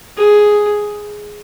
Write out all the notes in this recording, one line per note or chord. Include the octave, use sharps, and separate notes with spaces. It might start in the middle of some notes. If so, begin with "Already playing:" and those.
G#4